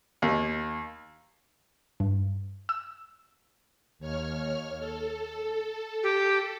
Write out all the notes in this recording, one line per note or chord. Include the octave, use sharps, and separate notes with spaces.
D#2
G2
E6
D#2 C#5 F6
A4
G4